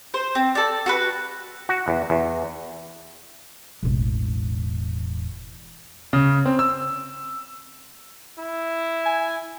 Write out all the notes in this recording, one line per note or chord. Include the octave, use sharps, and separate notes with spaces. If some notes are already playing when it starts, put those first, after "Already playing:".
C5
C4
A4 D5
F#4 A4 B4
F#4
E2
E2
E1 A1
C#3
C4
E6
E4
G#5